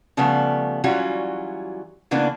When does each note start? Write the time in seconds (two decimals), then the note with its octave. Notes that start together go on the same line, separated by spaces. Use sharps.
0.17 C#3 F3 G3 A3 B3
0.84 E3 F#3 G3 C#4 F4 F#4
2.11 C#3 E3 A#3 B3 D4